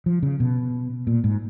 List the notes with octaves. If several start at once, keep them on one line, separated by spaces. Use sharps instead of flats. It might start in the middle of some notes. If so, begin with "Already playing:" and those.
F3
C#3
B2
A#2
G#2